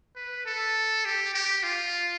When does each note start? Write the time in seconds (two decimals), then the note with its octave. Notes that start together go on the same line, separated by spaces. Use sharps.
0.16 B4
0.46 A4
1.05 G4
1.34 G4
1.63 F4